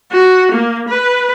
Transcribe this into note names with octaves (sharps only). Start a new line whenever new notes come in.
F#4
A#3
B4